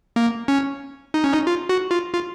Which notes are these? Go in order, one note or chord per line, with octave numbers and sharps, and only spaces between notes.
A#3
C#4
D#4
C#4
D#4
F4
F#4
F4
F4